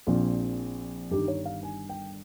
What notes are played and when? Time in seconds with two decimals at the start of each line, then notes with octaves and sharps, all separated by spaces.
0.07 A#1 A#2 F3 C4 F4
1.11 G1 G2 D#3 G4
1.28 C#5
1.45 F5
1.63 G#5
1.89 G5